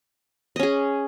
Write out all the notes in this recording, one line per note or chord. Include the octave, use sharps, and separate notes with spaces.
C#4 G#4 D#5